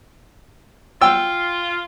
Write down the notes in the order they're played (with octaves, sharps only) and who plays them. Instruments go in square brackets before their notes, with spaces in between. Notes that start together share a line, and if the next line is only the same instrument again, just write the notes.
[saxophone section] F4 [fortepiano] G5 E6